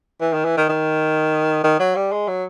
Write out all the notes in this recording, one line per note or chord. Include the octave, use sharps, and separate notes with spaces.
E3
D#3
E3
D#3
D#3
D#3
F#3
G3
G#3
F#3